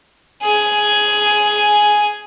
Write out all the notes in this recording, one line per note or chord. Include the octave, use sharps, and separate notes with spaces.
G#4 G#5